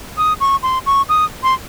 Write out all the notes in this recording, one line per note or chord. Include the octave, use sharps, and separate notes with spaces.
D#6
C#6
C6
C#6
D#6
C6